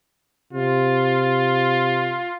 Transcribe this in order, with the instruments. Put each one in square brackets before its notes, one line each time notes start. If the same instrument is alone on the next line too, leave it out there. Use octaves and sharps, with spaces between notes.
[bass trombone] C3 [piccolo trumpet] F4